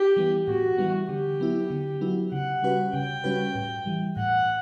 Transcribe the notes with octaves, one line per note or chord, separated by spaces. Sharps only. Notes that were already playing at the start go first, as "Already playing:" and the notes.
Already playing: G4
E3 G3 B3
A2 F#4
E3 G3 B3
D3 G4
F#3 B3 E4
D3
F#3 B3 E4
C#3 F#5
G3 C#4 F#4 B4
C#3 G5
G3 C#4 F#4 B4
A2
E3 G3
A2 F#5